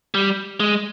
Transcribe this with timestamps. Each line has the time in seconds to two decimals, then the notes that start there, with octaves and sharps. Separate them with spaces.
0.14 G3
0.60 G#3